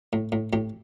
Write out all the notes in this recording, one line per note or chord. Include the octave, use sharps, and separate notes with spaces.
A2
A2
A2 G4